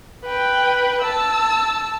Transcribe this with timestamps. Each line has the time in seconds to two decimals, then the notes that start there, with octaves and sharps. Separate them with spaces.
0.25 B4 G5
1.02 A5 E6